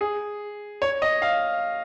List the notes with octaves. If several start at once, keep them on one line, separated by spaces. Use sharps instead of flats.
G#4
C#5
D#5
F5